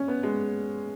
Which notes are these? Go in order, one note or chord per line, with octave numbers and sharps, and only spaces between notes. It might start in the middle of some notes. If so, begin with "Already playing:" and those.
Already playing: C#4
B3
G#3